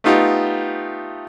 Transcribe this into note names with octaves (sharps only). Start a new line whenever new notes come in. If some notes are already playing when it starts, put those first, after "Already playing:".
A3 B3 D#4 F4 G4